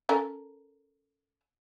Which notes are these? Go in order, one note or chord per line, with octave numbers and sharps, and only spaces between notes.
C#4 A4 A#4